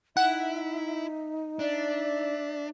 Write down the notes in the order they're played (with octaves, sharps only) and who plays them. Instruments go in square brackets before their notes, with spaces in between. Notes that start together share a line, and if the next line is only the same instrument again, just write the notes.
[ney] D#4 [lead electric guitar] E4 [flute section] E5 [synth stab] F#5
[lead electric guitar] D4 [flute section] D5 E5